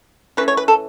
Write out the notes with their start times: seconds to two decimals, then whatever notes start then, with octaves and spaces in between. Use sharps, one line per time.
0.37 E3 A3 C#4 B4
0.48 C#5
0.57 B4
0.68 A4